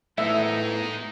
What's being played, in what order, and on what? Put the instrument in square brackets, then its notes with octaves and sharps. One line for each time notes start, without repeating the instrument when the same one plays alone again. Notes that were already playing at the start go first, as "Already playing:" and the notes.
[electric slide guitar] A2 A3 B3 [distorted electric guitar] G#3 D#4 [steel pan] E5